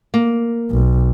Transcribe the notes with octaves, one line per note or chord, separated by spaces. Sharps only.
A#3
B1